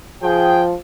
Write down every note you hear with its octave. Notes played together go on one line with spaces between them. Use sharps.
F3 G#4 G5